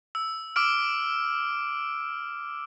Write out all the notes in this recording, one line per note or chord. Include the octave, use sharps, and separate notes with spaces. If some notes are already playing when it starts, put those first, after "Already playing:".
E6
D6 E6 F6 D7